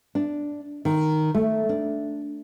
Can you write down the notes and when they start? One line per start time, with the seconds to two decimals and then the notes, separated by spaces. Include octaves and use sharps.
0.15 D4
0.85 D#3
1.35 A3
1.69 D4